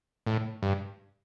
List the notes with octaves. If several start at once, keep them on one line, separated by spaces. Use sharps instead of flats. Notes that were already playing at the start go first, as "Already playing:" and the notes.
A2
G2